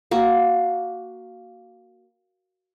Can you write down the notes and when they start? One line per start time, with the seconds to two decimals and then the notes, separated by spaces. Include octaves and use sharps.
0.11 A#3 F#4